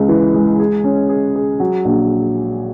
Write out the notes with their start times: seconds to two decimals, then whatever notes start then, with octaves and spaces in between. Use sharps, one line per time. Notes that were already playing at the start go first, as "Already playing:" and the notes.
Already playing: C#2 G#3
0.09 E3
0.34 G#3
0.60 G#4
0.84 C#4
1.09 G#4
1.36 G#4
1.60 F#3
1.85 A#1